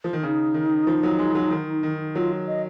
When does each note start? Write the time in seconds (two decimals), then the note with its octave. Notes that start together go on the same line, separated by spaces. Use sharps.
0.04 F3
0.13 D#3
0.23 C#3 D#4
0.54 D#3
0.87 F3
1.03 F#3
1.19 G#3
1.35 F#3
1.51 D#3
1.83 D#3
2.15 F#3 F4
2.48 D#5